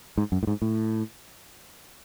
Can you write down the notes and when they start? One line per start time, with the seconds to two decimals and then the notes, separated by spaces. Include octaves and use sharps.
0.18 G#2
0.32 F#2
0.43 A2
0.47 G#2
0.62 A2